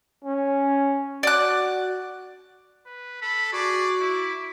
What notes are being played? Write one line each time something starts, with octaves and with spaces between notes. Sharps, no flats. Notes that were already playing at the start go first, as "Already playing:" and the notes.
C#4
F#4 D5 F#6
B4
A4 B5
F#4 G#4 D5
E4 D6